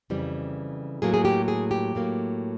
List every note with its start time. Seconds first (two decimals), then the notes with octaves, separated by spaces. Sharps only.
0.10 F2 C#3 E3 G3
1.02 A2 F#3 A#3 G#4
1.14 G#4
1.25 G4
1.48 G#4
1.71 G4
1.95 A2 F#3 A#3